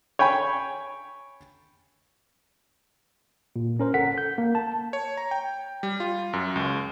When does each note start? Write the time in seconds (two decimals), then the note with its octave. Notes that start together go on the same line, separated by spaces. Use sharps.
0.19 C#5 G5 G#5 B5
3.56 A#2
3.80 C#4 A#4 C5
3.94 G1 A4 F#5 B6
4.18 G6
4.38 A#3
4.55 A5
4.93 C#5
5.17 A#5
5.31 G5
5.83 G3
6.00 F4
6.33 F#2
6.56 C#2